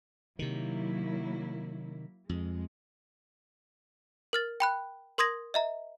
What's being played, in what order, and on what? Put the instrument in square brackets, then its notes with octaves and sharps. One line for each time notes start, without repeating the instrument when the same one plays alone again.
[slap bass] C3 D#3 [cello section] F#3 A#3 E4
[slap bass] F2 [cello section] G#3
[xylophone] A#4 F6 A6
G5 B5 F#6
A#4 C6 D#6 G#6 A#6
D#5 E5 A#5